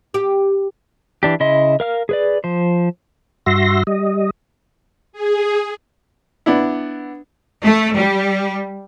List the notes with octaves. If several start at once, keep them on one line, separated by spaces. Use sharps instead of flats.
G4
E3 D4 G4
C#3 E4 D#5 C6
A#4 F5 F6
G#4 B4 D5
F3 C5
G2 F#4 E5 C6 A#6
G3 D#5
G#4
B3 D4 E4
A3
G3